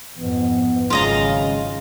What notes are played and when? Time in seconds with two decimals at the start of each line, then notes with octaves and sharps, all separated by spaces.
0.17 F2 G#2 B3
0.90 G#1 C#3 F#3 G#3 F4 D#5 A#5